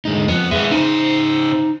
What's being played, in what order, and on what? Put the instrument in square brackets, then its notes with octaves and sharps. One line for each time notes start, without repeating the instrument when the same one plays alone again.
[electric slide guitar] D3 G#3 D#4
[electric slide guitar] F2 [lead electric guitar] B3
[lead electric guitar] G#3 B3 [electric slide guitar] B4 E5
[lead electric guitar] C#3 C5 [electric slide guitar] D#4